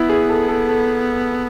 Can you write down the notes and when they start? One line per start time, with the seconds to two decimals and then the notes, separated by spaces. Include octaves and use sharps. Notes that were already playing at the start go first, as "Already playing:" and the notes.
Already playing: B3 E4
0.10 G#4
0.29 A4
0.48 A4
0.68 A4